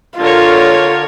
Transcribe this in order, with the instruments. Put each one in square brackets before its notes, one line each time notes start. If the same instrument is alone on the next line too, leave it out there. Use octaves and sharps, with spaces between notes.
[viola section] D3 A#4 C#5 [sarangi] F4